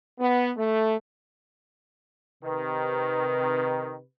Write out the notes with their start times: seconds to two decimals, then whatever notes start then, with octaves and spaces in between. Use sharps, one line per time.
0.19 B3
0.57 A3
2.43 C3 D#3 B4